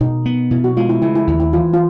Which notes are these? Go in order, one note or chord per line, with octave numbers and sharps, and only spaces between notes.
B2 D#4
B3
B2 E4
F#4
G#3 F4
E4
C#3 E4
E4
D#2 E4
E4
E3 F4
F4